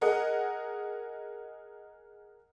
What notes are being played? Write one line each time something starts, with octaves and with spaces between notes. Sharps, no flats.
G#4 A#4 D#5 F#5